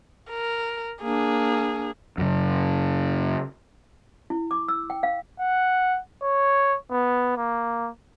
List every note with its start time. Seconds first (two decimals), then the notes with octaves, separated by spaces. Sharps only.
0.30 A#4
1.03 A#3 D4 G#4
2.18 F#2 C#3
4.30 E4
4.51 D6
4.68 E6
4.90 G5
5.03 F5
5.40 F#5
6.23 C#5
6.91 B3
7.37 A#3